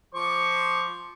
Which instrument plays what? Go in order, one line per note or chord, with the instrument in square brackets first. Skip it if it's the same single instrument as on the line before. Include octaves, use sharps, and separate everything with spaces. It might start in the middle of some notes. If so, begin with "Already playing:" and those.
[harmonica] F3 C#6 D6 [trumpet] C5